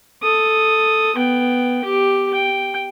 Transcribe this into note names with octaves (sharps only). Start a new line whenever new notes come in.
A4 D#6
B3 G5
G4
G5